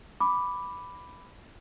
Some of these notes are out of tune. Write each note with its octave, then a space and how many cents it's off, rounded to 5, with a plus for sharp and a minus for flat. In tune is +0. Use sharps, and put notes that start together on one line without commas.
B5 +0 D6 +0